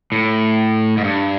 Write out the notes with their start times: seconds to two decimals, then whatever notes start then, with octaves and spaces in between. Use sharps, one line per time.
0.12 A2
0.97 G#2
1.04 G2